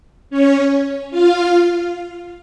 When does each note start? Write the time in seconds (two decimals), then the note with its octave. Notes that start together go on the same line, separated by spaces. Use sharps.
0.30 C#4 C#5
1.11 F4 F5